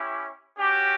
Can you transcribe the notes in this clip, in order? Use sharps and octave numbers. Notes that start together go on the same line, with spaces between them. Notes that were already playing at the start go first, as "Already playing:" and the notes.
Already playing: C#4 E4 G4
C#4 F#4 G4